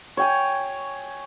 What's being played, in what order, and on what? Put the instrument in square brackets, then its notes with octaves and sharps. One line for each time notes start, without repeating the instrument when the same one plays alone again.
[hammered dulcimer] C#5 G5 G#5